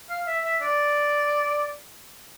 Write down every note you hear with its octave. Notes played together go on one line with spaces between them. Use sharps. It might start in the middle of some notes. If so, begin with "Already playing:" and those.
F5
E5
E5
D5